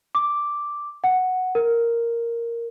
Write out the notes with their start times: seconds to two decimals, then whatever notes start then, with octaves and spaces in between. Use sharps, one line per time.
0.15 D6
1.04 F#5
1.55 A#4